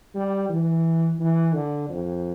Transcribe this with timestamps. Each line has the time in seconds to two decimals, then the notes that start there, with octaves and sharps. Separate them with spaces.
0.15 G3
0.49 E3
1.19 E3
1.54 D3
1.89 F2